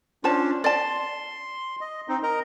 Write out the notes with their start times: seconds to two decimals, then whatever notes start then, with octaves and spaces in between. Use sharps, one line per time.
0.24 C#4 D4 F4 C5 A5
0.64 D5 A5 C6
1.81 D#5
2.08 C4 D#4
2.23 A#4 D#5 A#5